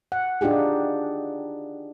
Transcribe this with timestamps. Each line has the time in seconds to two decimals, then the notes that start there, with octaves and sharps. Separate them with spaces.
0.12 F#5
0.41 D4 D#4 F4 G4 G#4